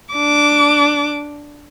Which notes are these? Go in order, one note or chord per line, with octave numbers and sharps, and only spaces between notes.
D4 D6